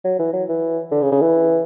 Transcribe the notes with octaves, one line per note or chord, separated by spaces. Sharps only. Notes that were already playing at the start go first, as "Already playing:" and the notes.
F#3
E3
F#3
E3
D3
C#3
C#3
E3